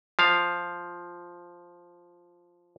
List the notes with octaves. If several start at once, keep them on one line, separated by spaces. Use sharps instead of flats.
F3 F5